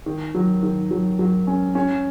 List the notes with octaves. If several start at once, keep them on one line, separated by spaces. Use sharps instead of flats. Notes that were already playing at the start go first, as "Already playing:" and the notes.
D#3
F#3
D#3
F#3
F#3
C#4
C#4